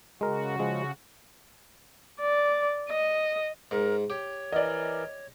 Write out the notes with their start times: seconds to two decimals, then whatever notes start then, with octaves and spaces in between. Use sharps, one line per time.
0.21 C#3 G#3 F#4 A#4
0.60 F3 G#3
2.20 D5
2.90 D#5
3.71 G#2 A#4
4.10 G4 C#5
4.52 E3 A#4 D5 D#5